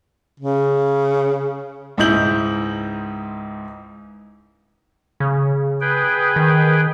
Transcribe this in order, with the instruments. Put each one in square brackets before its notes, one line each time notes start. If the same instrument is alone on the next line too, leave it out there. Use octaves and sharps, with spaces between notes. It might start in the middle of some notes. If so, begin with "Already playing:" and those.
[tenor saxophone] C#3
[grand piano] C#2 G#2 D#4 E4 G6 F#7
[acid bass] C#3
[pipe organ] G#4 B4 G5
[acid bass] D#3